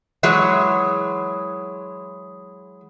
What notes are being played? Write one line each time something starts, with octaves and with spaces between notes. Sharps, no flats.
E3 F#3 G#3